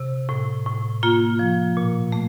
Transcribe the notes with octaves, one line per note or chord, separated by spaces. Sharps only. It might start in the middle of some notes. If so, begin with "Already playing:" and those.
Already playing: C3
A2
A2
A#3 F4
F3
A#2
A3